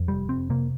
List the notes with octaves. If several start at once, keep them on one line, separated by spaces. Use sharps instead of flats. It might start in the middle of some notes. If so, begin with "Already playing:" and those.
Already playing: F2
F1 G3
F1 C4
C3 A#3